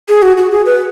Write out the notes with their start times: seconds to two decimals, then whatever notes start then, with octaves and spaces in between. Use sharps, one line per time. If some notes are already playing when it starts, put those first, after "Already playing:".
0.09 G#4
0.22 F#4
0.37 F#4
0.52 G#4
0.66 B4